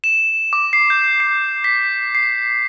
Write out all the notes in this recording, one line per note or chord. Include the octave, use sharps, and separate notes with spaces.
E7
D6
C7
G6
C7
B6
C7